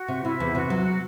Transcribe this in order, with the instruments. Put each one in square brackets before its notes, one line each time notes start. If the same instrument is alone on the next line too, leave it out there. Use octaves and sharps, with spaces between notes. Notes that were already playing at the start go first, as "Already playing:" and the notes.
Already playing: [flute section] F#4
[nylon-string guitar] C3
[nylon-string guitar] C3 [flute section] E4
[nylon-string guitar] E2
[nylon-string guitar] C3 [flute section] F#4
[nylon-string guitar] F#3
[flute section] F#4